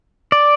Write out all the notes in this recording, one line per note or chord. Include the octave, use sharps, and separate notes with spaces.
D5